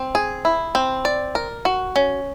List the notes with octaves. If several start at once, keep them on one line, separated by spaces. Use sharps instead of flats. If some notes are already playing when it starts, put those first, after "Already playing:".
Already playing: C4
G#4
E4
C4
D5
A#4
F#4
C#4